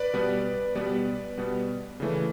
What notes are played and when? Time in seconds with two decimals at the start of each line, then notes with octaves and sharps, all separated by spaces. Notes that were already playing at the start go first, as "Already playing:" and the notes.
Already playing: B4 D5
0.13 B2 G3 B3
0.75 B2 G3 B3 B4 D5
1.37 B2 G3 B3
2.00 C#3 E3 A3